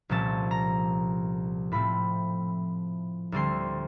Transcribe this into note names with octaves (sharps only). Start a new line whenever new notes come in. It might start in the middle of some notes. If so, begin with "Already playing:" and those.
C2 A#2 F3 A3 C#4 A5
A#5
A2 F3 A3 C4 B5
D2 D3 G3 C4 C6